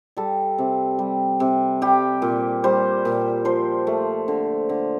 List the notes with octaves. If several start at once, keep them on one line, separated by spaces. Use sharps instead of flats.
G3 A4
C3
G3
C3
G3 G4
A#2
G3 C5
A#2
F3 C5
A3
D3
D3